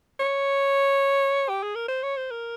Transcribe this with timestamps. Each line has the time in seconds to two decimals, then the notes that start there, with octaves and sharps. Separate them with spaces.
0.20 C#5
1.49 G4
1.63 G#4
1.75 A#4
1.88 C5
2.03 C#5
2.17 C5
2.31 A#4